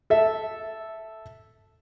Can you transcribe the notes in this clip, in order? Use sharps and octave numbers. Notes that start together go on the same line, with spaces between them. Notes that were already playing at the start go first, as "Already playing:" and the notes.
A4 E5